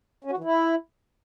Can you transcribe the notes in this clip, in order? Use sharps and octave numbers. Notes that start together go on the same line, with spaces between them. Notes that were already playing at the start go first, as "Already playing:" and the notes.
C#4
F#4
E3
E4